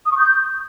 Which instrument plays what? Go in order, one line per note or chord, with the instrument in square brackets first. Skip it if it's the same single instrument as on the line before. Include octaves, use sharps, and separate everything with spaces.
[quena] D#6
C#6
G6